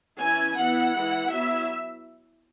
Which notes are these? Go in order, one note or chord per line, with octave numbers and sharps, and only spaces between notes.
E3 C#4 E4 G#5
E3 B3 E4 F#5
E3 G#3 E4
F#3 B3 E4 E5